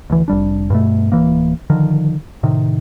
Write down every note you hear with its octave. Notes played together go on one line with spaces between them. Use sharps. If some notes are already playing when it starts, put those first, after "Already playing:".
D2 E3
F1 G3 D4
G2 B2 A3
D1 C2 E3 A#3
D3 D#3 F3
A2 C3 D#3